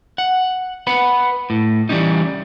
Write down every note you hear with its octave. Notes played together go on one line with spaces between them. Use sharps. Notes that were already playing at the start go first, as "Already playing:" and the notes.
F#5
B4 F#5 B5
A2
E3 G3 G#3 C#4 D#4